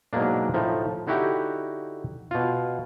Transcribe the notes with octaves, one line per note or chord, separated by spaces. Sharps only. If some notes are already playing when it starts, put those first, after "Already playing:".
G#2 B2 F#3 G#3 A#3 D4
A2 F3 D#4
D3 D#4 E4 F#4 G4
B2 F4